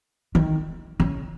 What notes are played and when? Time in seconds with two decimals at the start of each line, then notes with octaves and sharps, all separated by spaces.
0.35 D#3
1.00 C#3